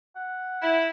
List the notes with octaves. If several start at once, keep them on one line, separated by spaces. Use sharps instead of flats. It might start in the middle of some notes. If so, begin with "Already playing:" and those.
F#5
E4